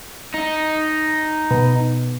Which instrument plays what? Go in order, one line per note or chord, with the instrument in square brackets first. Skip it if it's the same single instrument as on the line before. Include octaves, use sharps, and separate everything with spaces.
[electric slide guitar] D#4
[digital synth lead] B2